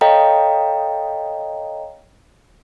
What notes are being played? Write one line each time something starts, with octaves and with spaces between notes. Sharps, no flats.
A4 C#5 D#5 F5 G5 A#5